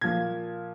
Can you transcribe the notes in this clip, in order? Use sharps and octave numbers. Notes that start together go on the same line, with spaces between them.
A#2 F3 G#6